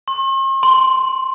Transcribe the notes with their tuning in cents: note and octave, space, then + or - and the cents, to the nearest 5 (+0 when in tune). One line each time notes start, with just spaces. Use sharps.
C6 +45
C6 -5